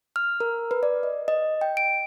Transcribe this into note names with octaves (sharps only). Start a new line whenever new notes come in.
F6
A#4
B4
D5
D#5
D#5
G5
D7